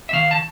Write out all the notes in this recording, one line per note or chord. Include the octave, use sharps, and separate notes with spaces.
E5
D#3 F5
A5